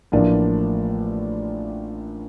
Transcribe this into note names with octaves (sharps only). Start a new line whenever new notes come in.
A1 A2 F3 A#3 D4